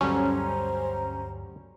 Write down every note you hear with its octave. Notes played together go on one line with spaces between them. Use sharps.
D2 G2 F#3 G3 C#4 A4 C5 A#5